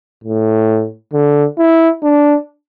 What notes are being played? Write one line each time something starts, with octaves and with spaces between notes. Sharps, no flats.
A2
D3
E4
D4